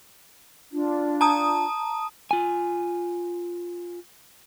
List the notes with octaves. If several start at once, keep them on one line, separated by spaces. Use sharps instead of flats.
D4 F4
A5 A#5 D#6
F4 G#5